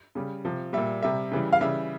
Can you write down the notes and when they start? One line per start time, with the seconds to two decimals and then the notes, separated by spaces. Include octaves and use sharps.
0.15 C#3 G3
0.45 C3 F3
0.73 A#2 G3 E5
1.02 C3 G3 E5
1.32 C#3 E3 G3
1.53 F5
1.61 C#3 E3 G3 E5